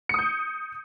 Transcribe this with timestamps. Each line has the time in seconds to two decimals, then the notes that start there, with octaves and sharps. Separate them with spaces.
0.09 C#7
0.14 D#6
0.19 G6